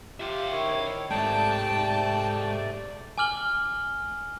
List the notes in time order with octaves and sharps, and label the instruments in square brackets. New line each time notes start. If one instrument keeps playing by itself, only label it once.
[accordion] F4 G4 [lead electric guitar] E5 G5
[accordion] D#3 E4 C#5
[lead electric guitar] G#2 [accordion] C3 A3 D5 [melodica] G5 [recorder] A5
[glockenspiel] G#5 D6 F6 F#7 G7